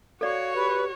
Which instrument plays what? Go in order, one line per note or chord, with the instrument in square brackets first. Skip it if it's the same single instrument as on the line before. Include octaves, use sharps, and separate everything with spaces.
[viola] F#4 C#5 [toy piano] A4 D5 [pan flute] F5
[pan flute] G4 [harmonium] B4